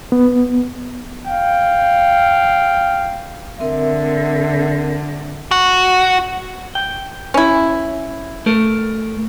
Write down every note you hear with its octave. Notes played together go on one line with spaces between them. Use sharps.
B3
F5 G5
D3 C4 A#4 E5
F#4
G5
C#4 E4
A3 A4 A#4